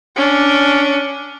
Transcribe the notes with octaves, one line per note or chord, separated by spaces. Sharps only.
C#4 D4